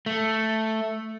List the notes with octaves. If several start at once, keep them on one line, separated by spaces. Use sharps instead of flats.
A3